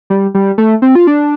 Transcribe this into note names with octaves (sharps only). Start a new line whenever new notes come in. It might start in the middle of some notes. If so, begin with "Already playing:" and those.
G3
G3
A3
C4
F4
D4